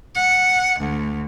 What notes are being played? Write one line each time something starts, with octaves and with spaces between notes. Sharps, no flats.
F#5
D2